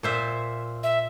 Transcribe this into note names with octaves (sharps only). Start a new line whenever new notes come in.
A#2 C5 E5
E5